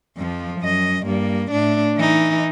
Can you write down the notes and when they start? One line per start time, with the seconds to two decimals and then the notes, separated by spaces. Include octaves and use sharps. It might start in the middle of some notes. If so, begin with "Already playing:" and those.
0.17 F2 F3
0.60 F#2 D#5
1.05 G2 A#3
1.51 A2 D4
1.96 E3 D#4